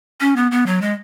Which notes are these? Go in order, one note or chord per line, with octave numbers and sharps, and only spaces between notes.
C#4
B3
B3
F#3
G#3